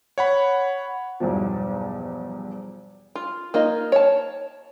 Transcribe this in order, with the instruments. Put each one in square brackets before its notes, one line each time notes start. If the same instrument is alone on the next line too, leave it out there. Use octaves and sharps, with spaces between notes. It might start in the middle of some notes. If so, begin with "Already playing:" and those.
[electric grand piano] C#5 F#5 B5
[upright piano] B1 E2 G2 F3
[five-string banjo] F4
A#3 D#4 F4 D#5
C#5 A5